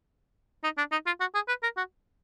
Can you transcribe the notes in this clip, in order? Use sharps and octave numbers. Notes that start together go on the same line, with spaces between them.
D#4
D4
D#4
F4
F#4
G#4
B4
A#4
F#4